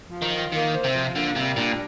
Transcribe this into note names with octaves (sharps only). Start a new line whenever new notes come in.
F3
D#3
F4
D#3 A#3
C5
C3
F3
D3 A#3
C3 G3
A#2 D4